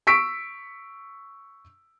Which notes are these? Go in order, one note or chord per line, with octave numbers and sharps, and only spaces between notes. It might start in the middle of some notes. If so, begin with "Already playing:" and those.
C#6 E6 B6 D7